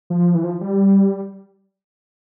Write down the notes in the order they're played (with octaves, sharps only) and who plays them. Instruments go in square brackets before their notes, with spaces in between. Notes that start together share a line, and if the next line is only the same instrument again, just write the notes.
[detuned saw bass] F3
E3
F3
G3